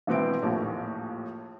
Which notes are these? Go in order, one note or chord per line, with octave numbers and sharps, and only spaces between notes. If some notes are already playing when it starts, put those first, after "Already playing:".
G#1 B2 E3 B3 C4 D7
A#1 D#2 A2